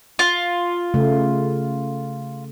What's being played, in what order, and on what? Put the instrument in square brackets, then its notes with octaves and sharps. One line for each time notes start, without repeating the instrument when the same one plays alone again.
[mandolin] F4
[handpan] C#3 A3